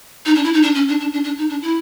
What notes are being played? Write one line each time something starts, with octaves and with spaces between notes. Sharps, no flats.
D#4
D4
E4
D#4
D4
C#4
D4
D4
D4
D4
D#4
D4
E4